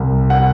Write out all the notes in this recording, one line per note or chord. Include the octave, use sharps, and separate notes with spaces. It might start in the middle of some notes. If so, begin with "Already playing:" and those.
Already playing: C2
F#5